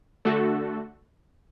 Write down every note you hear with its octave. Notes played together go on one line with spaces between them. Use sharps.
D3 A3 F#4 A4